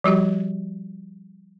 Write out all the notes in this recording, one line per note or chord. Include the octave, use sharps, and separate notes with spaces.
F3 G3 F#4 G4